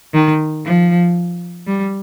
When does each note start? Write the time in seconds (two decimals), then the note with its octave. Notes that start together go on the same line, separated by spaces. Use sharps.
0.14 D#3
0.65 F3
1.67 G3